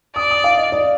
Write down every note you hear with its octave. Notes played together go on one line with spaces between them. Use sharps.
D5 D#6
D#6
F5
D#5
D5